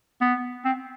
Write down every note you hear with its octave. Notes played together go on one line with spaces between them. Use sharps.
B3
C4